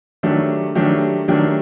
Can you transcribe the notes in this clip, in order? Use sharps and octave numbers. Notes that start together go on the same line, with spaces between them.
D#3 F#3 A3 D4 G4
D#3 F#3 A3 D4 G4
D#3 F#3 A3 D4 G4